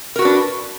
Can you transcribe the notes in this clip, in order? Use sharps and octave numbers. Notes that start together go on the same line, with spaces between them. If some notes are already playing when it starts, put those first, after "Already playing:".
D4 F#4 A#4 B4